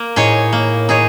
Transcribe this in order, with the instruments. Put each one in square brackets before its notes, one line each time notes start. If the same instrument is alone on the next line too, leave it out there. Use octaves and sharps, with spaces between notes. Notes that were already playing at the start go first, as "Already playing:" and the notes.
Already playing: [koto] A#3
[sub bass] A2 [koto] D#4 G#4 C#5
[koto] A#3
D#4 G#4 C#5